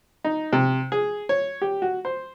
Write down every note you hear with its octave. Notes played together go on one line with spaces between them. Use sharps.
D#4
C3
G#4
C#5
G4
F#4
C5